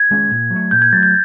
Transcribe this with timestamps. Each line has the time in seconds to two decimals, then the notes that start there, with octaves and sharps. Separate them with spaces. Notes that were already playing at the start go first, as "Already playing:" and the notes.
Already playing: G#6
0.11 D#3 G#3 C#4
0.31 A#2
0.51 F#3 A3
0.71 A#2 G6
0.82 G#6
0.92 F#3 A3 A6
1.03 G6